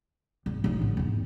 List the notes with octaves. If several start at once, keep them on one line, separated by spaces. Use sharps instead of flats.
G#1
A1 D#4
D3
E2 G#2